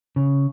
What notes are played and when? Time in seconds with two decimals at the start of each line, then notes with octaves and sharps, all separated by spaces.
0.16 C#3